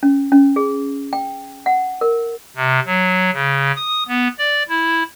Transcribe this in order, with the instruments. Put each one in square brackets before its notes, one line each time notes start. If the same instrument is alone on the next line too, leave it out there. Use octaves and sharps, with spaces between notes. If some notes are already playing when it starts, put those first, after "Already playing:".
[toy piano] C#4
C#4
G#4
G5
F#5
A#4
[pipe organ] C3
F#3
C#3
D#6
B3
D5
E4